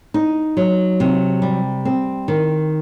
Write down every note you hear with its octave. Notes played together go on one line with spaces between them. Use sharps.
D#4
F#3
C3
G3
C4
D#3